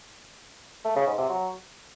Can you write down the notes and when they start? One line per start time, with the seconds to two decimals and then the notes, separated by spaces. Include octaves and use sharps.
0.85 A3
0.96 C#3
1.07 G#2
1.18 C3
1.29 F#3